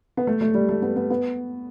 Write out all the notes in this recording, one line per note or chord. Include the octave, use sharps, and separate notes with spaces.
B3
A3
A3
G3
A3
B3
B3
B3